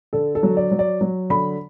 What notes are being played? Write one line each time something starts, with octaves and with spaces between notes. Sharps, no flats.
D3 A4
A4
F#3
D5
F#3
D5
F#3
D3 B5